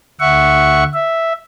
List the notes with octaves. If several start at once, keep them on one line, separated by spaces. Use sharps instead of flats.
D2 E5 F#5 C#6
E5